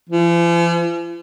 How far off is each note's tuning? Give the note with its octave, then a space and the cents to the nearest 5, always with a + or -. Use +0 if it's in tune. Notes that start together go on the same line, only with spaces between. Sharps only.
F3 -45